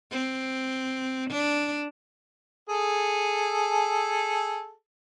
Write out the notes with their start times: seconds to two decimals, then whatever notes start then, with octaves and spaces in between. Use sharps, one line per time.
0.12 C4
1.30 D4
2.69 G#4 A4